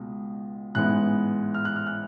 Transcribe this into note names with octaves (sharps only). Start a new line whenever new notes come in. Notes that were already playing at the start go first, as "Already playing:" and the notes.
Already playing: C#2 B2 G#3
A1 G#2 E3 G#3 B3 F#6
F6
F#6
F6
F#6